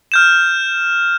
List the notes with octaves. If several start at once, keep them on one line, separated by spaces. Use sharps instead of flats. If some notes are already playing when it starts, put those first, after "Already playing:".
F6 G6 E7